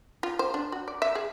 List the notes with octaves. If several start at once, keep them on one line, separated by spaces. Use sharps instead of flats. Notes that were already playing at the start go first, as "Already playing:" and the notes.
F4
C5
D4
F#4
D5
E5
G#4